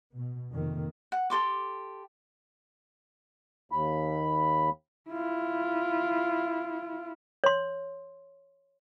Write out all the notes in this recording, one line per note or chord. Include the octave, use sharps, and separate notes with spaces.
B2
F2 C3 D#3 A#3
F#5
G4 A4 C6 D6
D#2 B5
E4 F4
C#5 C6